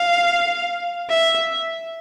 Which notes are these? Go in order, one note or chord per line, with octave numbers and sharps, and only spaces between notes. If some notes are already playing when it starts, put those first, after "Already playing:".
Already playing: F5
E5